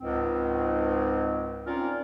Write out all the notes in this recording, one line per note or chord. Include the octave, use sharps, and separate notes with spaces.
C#2 G#2 C4
C4 C#4 D#4 F4 A#4 D5